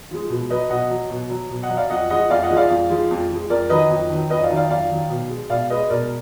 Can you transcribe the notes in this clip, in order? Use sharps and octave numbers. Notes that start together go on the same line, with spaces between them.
F3 G#3
B2
F#3 B4 D#5
B2 D#5 F#5
F#3
B2
F#3
B2
D#5 F#5
F#3
D5 F5
F2 D#5 F#5
F3 G#3 D#5 F#5
F2 D5 F5
D#5 F#5
F3 G#3
D5 F5
F2
F3 G#3
F2
F3 G#3
F2 A#4 D5
D#3 F#3 B4 D#5
F2
D#3 F#3
F2 B4 D#5
D5 F5
D#3 F#3
D5 F5
F2 D5 F5
D#3 F#3
B2
G#3
B2 D5 F5
G#3 B4 D#5
B2 A#4 D5